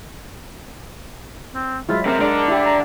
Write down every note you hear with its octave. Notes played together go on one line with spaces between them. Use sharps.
C4
F#3 G#3 E4 F4
C3 C4 A#4
D3 G#3 D4 D5
E4 G4
A#5